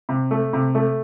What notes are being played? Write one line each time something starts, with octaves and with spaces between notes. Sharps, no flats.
C3
A3
C3
A3